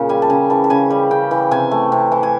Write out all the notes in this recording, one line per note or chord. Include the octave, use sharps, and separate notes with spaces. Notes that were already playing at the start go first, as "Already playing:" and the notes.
Already playing: A#2 C#3
G3 G#5
A5
C#3 G#5
E3 A5
A5
C#3 G#5
G3
C#3 G5
E3
C3 G#5
A3
C3
E3
G#5